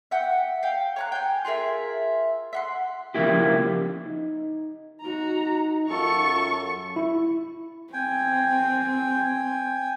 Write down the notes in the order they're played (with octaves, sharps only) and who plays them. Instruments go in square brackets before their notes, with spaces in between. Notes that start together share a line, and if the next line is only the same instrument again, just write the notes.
[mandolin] E5 F#5 G5
F5 G5
C#5 A#5 F#6
G5 G#5
F4 G#4 A#4 E5
E5 F#5 C6
[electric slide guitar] C#3 F3 A#3 E4 G4
[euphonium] D#4
[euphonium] D#4 [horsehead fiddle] F#4 A#5
[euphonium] F#2 [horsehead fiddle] F4 A4 [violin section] C#6
[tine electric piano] E4
[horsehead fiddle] C4 [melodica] G5 G#5